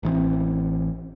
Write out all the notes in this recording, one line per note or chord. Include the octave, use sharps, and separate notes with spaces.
A1 E3 G#3 C4